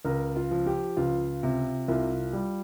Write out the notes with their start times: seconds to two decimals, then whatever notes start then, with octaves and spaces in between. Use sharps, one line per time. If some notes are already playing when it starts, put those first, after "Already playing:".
0.05 C#2 A#4
0.36 F4
0.51 F3
0.66 G4
0.97 C#2 F4
1.43 C3
1.88 C2 F4
2.33 G3